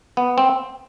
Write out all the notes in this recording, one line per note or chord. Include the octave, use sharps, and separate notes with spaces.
B3
C4